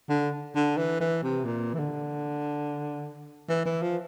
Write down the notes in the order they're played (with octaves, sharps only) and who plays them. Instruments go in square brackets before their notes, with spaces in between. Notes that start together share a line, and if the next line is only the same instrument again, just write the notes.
[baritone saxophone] D3
D3
E3
E3
C3
A#2
E3
D3
E3
E3
F3